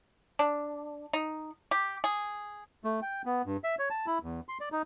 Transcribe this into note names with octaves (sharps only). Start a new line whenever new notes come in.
D4
D#4
G4
G#4
A3
G5
B3
G2
E5
C#5
A5
E4
E2
C6
D5
D#4